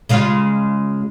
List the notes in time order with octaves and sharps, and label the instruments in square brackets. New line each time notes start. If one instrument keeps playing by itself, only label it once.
[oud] C#3 G#3 F4